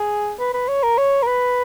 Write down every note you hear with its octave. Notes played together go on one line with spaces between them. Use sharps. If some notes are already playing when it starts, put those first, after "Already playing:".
Already playing: G#4
B4
B4
C#5
A#4
C#5
A#4
B4